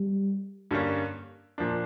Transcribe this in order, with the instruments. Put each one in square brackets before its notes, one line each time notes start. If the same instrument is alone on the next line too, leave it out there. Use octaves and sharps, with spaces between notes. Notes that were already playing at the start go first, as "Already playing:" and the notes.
Already playing: [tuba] G3
[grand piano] G2 D3 G3 A#3 C#4
A#2 F3 A#3 D4